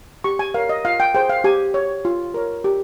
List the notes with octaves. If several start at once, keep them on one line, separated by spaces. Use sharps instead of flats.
G4 C#6
G#5
A#4 C#5 F5
D#5
F4 F5
G5
G#4 C5 G5
F5
G4 G#5
C#5
F4
A#4 C#5
G4